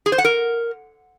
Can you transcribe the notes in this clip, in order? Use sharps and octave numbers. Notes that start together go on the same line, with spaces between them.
G#4
C5
F#5
A#4